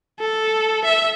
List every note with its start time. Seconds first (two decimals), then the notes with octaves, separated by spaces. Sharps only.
0.20 A4
0.85 E5